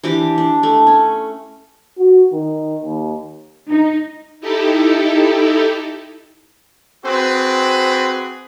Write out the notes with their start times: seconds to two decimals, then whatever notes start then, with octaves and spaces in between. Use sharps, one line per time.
0.04 E3 D4 G4 D6
0.38 D4
0.63 A3
0.87 C#4
1.98 F#4
2.32 D#3
2.84 D#2
3.70 D#4
4.40 D#4 E4 G4 A4
7.04 C4 F#4 G#4 B4